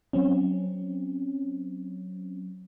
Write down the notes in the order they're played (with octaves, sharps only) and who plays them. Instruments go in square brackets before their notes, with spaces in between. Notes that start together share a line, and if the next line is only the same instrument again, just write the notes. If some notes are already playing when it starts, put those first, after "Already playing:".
[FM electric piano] F#3 C4 C#4